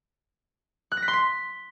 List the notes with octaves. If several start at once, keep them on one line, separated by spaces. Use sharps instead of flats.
F#6
A#6
B6
C6
B6